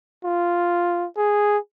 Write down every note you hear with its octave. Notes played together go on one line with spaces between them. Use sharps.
F4
G#4